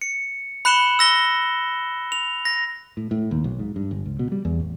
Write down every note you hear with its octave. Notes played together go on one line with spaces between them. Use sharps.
C#7
B5 F#6 C#7 E7 F#7 G7
E6 A#6 G7
F7
A#6
A2
A2
D#2
B1
G#2
G2
G1
C#2
B2
G3
E2
A1